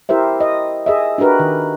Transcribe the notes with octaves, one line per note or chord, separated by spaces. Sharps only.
E4 G4 A#4 C5 E5
D#5
G#4 D#5 E5
D4 F#4 G4 A#4 B4
D#3